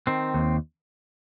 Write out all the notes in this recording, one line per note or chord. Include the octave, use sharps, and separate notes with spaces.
D#3 C4
D#2